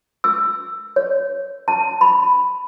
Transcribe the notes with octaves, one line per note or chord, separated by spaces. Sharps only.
E6
C#5
A5
B5